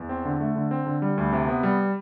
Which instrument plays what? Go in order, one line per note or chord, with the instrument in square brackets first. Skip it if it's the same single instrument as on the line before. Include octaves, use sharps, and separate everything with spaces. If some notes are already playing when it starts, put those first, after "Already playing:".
Already playing: [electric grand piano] E2
C4
D3
A3
D3
C4
D3
G3
D2
C3
B3
G3